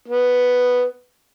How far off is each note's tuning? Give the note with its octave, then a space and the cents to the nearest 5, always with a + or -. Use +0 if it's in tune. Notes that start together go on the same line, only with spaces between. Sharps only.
B3 +0